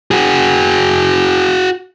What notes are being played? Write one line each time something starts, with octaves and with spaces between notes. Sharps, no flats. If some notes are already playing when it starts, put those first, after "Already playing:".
F#4 G#4